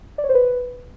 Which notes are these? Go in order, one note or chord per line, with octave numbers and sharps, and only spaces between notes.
D5
C#5
C5
B4